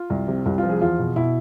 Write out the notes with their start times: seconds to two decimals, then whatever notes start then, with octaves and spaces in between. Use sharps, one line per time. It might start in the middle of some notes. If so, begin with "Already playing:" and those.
Already playing: F4
0.10 C2
0.28 C3
0.46 C2
0.58 F4
0.63 F3
0.69 G#4
0.81 E2 F4
0.99 B2
1.16 B2 E4